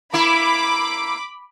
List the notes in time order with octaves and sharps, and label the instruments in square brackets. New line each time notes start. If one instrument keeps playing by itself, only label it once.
[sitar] A#3 E4 [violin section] B5 D6